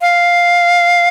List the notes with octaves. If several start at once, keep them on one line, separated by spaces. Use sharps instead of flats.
F5